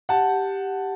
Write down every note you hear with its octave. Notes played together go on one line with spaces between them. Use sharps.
G4 F#5 A5
G4